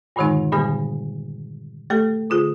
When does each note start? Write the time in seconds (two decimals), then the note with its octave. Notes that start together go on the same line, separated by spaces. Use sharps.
0.16 G2 A#2 D3 D#3 G#3 D#4
0.53 A#2 D3 G3 A#3 B3 G4
1.90 A3 G4 A4
2.30 D3 F4 G#4